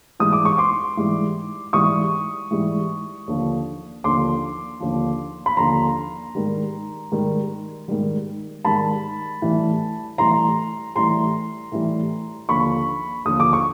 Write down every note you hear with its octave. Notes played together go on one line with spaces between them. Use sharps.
G#2 E3 G3 D#6
D6
C#6
C6 D6
G#2 E3 G3
G#2 E3 G3 C#6 D#6
G#2 E3 G3
D#2 D3 F3
D#2 D3 F3 C6 D6
D#2 D3 F3
B5
D#2 D3 F3 A#5 C6
G#2 D#3 G3
G#2 D#3 G3
G#2 D#3 G3
G#2 D#3 G3 A5 B5
A2 E3 G3
A2 E3 G3 A#5 C6
A2 E3 G3 A#5 C6
A2 E3 G3
D#2 D3 F3 B5 C#6
D#2 D3 F3 D#6
D6
C#6